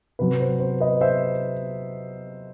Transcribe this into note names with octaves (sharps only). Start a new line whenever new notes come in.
C3 F#3 C4 B4
C5
C5
B4 D#5
C5 E5